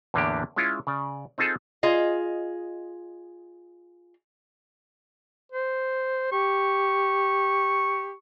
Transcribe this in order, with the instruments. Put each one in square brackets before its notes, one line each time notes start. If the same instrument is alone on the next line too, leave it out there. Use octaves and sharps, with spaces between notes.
[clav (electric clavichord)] E2 A2 D3 A#3 D4 G4
G#3 C#4 E4 F4 C#5
C#3 D5
C4 D#4 F4 G#4 A4
[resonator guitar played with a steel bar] F4 G#4 D#5
[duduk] C5
[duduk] G4 [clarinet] C#6